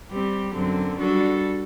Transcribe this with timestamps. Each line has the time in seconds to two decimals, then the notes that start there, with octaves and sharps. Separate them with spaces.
0.10 G3 C4 G4
0.55 F#2 D3 F#3 C4
0.98 G3 D4 F#4 A4